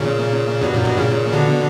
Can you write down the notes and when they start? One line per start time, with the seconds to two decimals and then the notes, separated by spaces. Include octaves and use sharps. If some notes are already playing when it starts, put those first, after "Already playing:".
Already playing: A#2 C#3
0.61 G2 B2
0.73 F#2 A#2
0.85 G2 B2
0.97 A#2 C#3
1.32 B2 D3